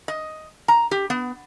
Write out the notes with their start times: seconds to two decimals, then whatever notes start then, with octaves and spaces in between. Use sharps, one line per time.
0.08 D#5
0.68 A#5
0.91 G4
1.10 B3